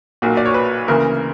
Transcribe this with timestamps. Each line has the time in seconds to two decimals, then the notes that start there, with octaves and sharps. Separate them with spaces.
0.22 B1 A#2 F#3 A#3
0.37 D5
0.46 C#5
0.54 B4
0.88 D2 C#3 E3 A#3 A#4